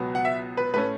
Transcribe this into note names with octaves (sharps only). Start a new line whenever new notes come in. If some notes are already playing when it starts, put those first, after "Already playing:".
Already playing: C#2 B2 F#3 B3
F#5
E5
B4
A2 A3 C#4 B4